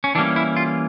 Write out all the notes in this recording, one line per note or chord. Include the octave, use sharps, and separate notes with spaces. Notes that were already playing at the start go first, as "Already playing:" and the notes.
C#4
E3 G3 A#3 C#4 D4
E4
F4